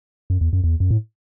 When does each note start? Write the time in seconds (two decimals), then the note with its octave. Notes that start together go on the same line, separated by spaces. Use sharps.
0.30 F#2
0.41 E2
0.53 F#2
0.64 E2
0.80 F#2
0.91 A2